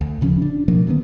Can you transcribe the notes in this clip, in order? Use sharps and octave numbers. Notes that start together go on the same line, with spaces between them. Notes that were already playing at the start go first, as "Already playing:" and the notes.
D2
D#1 C#3 F3 C#4
D4
B2 F3 F#3 A#3
D3 D#3 A#3 B3